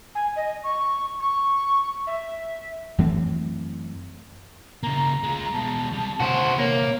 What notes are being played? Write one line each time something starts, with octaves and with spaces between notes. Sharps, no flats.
G#5
D#5
C#6
C#6
E5
F#2 E3 A3 C4
C#3 A#3 A#5
G#3 F4
B2 G#3 A5
C3 G3
C3 C#4 F#4 C5
A#3 C#5